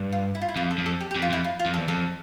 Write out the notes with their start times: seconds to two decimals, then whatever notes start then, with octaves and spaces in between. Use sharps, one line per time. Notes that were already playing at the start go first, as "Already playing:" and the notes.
Already playing: G2
0.13 F4
0.35 E4
0.42 F4
0.49 E4
0.56 F2 F4
0.71 A4
0.78 F2
0.86 A4
1.01 G4
1.11 G4
1.16 F2
1.22 F4
1.30 F2 E4
1.44 F4
1.59 F4
1.66 F2
1.74 A4
1.77 E2
1.88 F2 A4